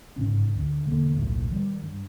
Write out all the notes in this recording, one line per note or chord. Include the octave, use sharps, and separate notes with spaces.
G1 G#2 C#3 C#4
D2
E1 D3 A#3
D#1 B1 A2
D#3 G3
G2